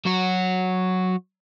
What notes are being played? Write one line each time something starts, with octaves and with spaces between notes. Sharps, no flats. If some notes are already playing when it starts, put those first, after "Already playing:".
F#3 F#4